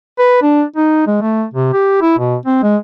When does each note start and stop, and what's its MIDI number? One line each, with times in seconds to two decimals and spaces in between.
0.19 0.38 71
0.42 0.63 62
0.76 1.06 63
1.07 1.18 56
1.21 1.44 57
1.54 1.71 48
1.73 1.98 67
2.01 2.16 64
2.18 2.35 47
2.46 2.59 60
2.63 2.76 56